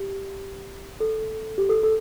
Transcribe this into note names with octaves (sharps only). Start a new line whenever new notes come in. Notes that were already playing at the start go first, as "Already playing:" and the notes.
Already playing: G4
A4
G4
A4
A4